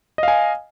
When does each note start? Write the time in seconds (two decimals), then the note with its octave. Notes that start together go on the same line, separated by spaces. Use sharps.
0.18 D#5
0.23 F5
0.28 G#5